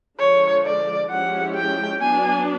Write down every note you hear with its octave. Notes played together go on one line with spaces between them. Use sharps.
D3 F3 G#3 C#5
D5
F3 G#3 C#4 E4 G4 F#5
G5
F#3 B3 D4 G#5